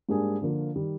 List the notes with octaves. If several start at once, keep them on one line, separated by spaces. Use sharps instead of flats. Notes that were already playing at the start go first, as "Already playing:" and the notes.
G#2 G3 A#3 D4 G#4
D3 F3 A#3 F4
D#3 G3